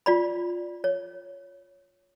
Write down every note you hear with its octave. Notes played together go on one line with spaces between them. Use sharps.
F4 D5 B5
C#5